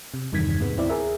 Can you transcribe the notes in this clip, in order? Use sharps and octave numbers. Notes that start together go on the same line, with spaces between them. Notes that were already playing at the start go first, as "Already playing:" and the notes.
C3
E2 G2 C3 D#3 G#6 B6
G#2 C3 G#3 B3
D2 C4 E4 D5
G#4 A#4 E5